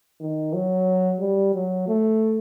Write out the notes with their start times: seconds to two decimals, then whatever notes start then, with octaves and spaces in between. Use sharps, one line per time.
0.21 D#3
0.54 F#3
1.20 G3
1.54 F#3
1.88 A3